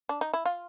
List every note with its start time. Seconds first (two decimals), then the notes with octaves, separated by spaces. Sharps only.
0.09 D4
0.21 D#4
0.33 E4
0.45 F4